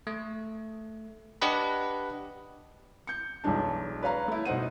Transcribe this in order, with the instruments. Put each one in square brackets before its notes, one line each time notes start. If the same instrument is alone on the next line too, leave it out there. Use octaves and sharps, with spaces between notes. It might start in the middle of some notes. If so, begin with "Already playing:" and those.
[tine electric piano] A3
D4 G4 B4 D#5 F#5 B5
[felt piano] G6 C#7
B1 E3 F#3 G#3 D4 A5
B4 C#5 F5 A#5
A3 E4
B2 D#4 C5 F#5 D#7